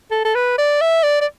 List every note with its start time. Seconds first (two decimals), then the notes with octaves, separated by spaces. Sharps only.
0.11 A4
0.25 A4
0.35 B4
0.58 D5
0.81 E5
1.03 D5
1.21 D5